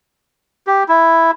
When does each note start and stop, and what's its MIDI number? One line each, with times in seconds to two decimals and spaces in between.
0.67 0.83 67
0.88 1.31 64